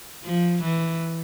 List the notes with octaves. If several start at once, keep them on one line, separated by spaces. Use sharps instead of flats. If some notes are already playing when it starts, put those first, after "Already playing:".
F3
E3